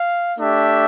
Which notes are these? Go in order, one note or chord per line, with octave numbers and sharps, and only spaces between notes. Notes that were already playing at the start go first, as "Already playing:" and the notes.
Already playing: F5
A3 D4 G4 E5